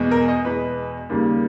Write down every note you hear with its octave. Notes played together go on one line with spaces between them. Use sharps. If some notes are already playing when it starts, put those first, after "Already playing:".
Already playing: E2 B2 G#3
A#4
D#5
E2 B2 G#3 B4
D#2 C#3 G3 A#3